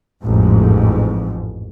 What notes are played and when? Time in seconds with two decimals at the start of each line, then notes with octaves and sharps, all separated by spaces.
0.24 A1 F2 G#2